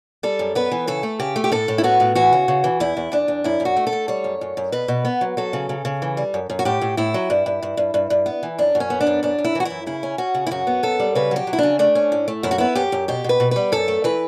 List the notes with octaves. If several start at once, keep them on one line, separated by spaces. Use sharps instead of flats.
G3 A4
F#2
B3 B4
E3
C#3 A4
A3
C#3 G4
A3
G4
A2 A4
A2
E4
B3 F#4
A2
E3 F#4
C#3
C#3
E3
E2 E4
E2
E2 D4
E2
F#2 E4
F#2
F#4
A3
A4
A3
G3 C#5
F#2
F#2
F#2
B2 B4
B2
B3
F#3
F#3 A4
C#3
C#3
C#3
E3
G3
F#2
F#2
F#4
A2 G4
A2
A2 E4
F#3
G2
G2
G2
G2
G2
G2
B3
E3
F#2 D4
F#2
C#4
B3
D4
F#2
F#2 D4
F#2
E4
E3 F#4
F#2 E4
C#3 E4
C#4
C#4 F#4
C#3
E4
F#2 F#4
B3
F#2 A4
G3
C#3 B4
F#3 G4
F#3
E4
C#3 D4
A3 D4
C#4
A2
A3
F#2 E4
F#4
B3 E4
F#2 G4
F#2
B2 G4
B2 B4
B2
G3 B4
F#2 A4
A3
E3 B4